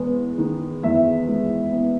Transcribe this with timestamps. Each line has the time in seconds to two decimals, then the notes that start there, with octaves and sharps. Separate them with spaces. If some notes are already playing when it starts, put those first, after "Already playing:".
Already playing: E2 G#3 B3
0.38 D#3
0.83 E2 E5
1.28 G#3
1.73 B3